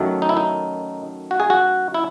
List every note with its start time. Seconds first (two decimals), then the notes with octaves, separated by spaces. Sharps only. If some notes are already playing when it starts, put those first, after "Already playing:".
Already playing: F#2 D#3 F#3 A3
0.22 D#4
0.29 E4
0.37 D#4
1.31 F#4
1.40 G#4
1.50 F#4
1.94 E4